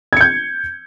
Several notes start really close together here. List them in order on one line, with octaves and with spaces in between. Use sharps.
G#6 C#7 G6